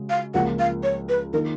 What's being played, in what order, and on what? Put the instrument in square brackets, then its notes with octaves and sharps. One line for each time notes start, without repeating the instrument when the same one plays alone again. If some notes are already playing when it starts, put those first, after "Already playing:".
Already playing: [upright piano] C#3 G#3 F#4
[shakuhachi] F5
[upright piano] C#2 C#3 F3 A#3 [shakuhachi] F#5
[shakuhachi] F5
C#5
B4
[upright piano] D#3 A#3 D#4 [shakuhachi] A#4